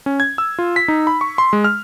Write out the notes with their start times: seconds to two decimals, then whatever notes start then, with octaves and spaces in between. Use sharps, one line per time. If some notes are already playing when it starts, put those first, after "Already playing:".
0.06 C#4
0.20 G#6
0.38 E6
0.59 F4
0.76 B6
0.88 D#4
1.07 B5
1.21 C#6
1.38 C6
1.53 G#3
1.64 F6